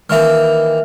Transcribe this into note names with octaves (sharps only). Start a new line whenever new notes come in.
D#3 E3 A#3 E5 F6